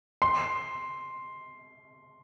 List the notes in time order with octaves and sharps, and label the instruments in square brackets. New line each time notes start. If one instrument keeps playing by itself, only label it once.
[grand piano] C6